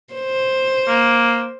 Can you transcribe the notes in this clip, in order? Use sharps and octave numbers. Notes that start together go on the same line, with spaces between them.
C5
A#3